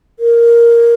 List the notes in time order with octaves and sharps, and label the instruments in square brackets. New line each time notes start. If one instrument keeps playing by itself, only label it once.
[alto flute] A#4